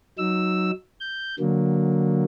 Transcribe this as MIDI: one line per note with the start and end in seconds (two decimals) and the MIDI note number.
0.18 0.71 54
0.18 0.71 63
0.18 0.71 88
1.00 1.35 91
1.39 2.24 50
1.39 2.24 54
1.39 2.24 58